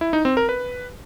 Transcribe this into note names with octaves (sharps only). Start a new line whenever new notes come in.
E4
D#4
C4
A#4
B4